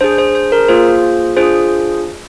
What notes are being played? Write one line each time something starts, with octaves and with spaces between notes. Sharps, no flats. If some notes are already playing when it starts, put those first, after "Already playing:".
D4 G#4 C5
C5
C5
A#4
A#3 F4 G#4 C5
D4 F4 G#4 C5